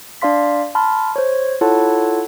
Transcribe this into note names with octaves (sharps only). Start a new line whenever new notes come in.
D4 D5 F5 C6 B6
A5 B5 C6 F6
C5 C#5
E4 F4 A4 C#5 F#5 A5